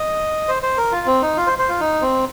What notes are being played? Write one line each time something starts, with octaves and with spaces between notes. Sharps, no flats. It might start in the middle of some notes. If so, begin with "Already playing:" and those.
Already playing: D#5
C5
C5
A#4
F4
C4
D#4
F4
C5
C5
F4
D#4
C4